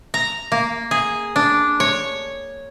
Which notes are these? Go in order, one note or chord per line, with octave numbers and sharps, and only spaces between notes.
A#5
A#3
G#4
D4
C#5